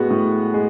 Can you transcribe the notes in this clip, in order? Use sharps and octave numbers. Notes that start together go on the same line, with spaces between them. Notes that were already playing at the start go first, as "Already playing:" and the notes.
Already playing: A2 G#3 B3 F#4
A2
G#3